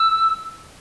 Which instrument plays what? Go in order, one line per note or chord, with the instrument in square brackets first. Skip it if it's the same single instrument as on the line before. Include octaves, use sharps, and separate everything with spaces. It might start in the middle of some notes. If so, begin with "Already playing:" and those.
Already playing: [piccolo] E6